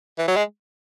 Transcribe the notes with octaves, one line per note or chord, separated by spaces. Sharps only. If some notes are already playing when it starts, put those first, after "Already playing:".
E3
F#3
G#3